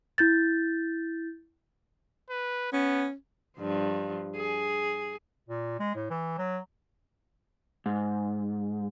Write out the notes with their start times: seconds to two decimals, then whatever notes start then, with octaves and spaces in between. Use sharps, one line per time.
0.18 E4 G6 A6
2.30 B4
2.73 B3 C#4
3.57 G2 F3
4.36 G#4
5.49 A#2
5.80 G#3
5.95 A2
6.10 E3
6.38 F#3
7.86 G#2